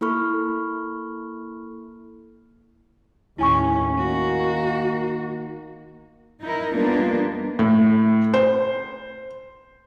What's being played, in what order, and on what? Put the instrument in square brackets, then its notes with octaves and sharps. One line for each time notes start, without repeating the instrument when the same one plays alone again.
[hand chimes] A#3 E4 A4 B5 C#6 F6
[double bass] D#2 A2 [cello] C#4 [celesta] E4 G#5 C#6
[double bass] D#3 A#3 [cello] F#4
[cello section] D#4 E4 A#4
G3 A#3 B3 D4 D#4 F4
[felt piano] A2
C5